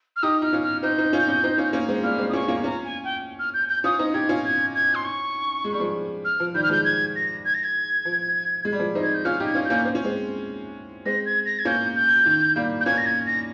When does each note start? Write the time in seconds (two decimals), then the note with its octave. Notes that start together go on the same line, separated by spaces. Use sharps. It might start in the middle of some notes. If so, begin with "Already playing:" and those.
0.16 F6
0.22 D#4 G4 D#6
0.42 D#4 F6
0.53 C#4 F4
0.63 F6
0.83 C4 D#4 G6
0.98 C4 D#4
1.13 C#4 F4
1.28 C#4 F4
1.43 C4 D#4
1.58 C#4 F4
1.73 A#3 C#4
1.88 G#3 C4
2.03 G3 A#3 F6
2.18 G#3 C4
2.29 D#6
2.33 A#3 C#4 C#6
2.48 A#3 C#4
2.63 C#4 F4 A#5
2.84 G#5
3.04 G5
3.39 F6
3.53 G6
3.68 G6
3.84 C#4 F4 D#6
3.99 C4 D#4
4.13 D#4 G4 G#6
4.29 C#4 F4
4.44 G#6
4.75 G#6
4.94 C6
5.05 C#6
5.64 G#3
5.72 G3
5.80 F3 G#3
6.24 F6
6.40 F3
6.54 D#3 G3 G6
6.63 F6
6.69 F3 G#3 G6
6.84 G#6
7.15 A#6
7.44 G#6
7.54 A#6
7.63 G#6
8.05 F3
8.65 G#3
8.72 G3
8.79 F3 G#3
8.95 C4 D#4
9.03 G#6
9.14 G6
9.25 C#4 F4 F6
9.40 D#4 G4
9.46 G#6
9.55 C#4 F4
9.65 G6
9.70 A#3 C#4
9.85 C4
9.95 C#4
10.04 G#3 C4
11.05 G#3 C4 A#6
11.25 G#6
11.45 A#6
11.58 G#6
11.65 A#3 C#4 G6
11.95 G6
12.26 D#3
12.56 G3 A#3
12.80 G6
12.85 A#3 C#4 G#6
12.97 A#6
13.05 G#6
13.26 A#6